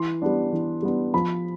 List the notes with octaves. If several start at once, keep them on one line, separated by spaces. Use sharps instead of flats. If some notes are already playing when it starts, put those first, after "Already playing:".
Already playing: E3 C6
G3 B3 D4
E3
G3 B3 D4
F3 B5